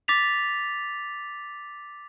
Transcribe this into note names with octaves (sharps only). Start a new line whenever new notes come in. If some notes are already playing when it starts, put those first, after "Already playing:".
D6 A6 B6 F7